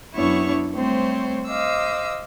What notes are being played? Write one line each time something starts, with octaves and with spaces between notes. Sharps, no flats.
F#2 B3 D4 E4 C#5 C#6
G3 A3 C4 C5 C#5
C5 D#5 F5 D6 E6